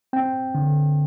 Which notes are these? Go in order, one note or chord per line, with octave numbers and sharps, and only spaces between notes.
C4 G5
D3